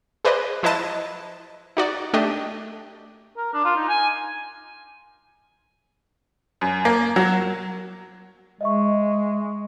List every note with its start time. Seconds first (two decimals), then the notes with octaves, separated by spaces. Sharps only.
0.24 G#4 B4 C5 D5 D#5
0.63 F3 E4 B4 D#5 A5
1.77 D#4 F#4 D5
2.13 A3 D4 G4 D#5
3.37 A#4
3.54 D4
3.65 F4
3.76 D#4
3.89 G#5
6.61 F#2
6.85 A#3
7.16 F#3
8.61 G#3 D#5 E5 C#6